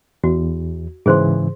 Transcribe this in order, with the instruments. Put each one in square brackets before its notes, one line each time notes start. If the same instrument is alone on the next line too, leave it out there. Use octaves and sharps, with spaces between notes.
[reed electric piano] E2 [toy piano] F#4
[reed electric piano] G#2 C#3 E3 [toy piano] G#4 C5 C6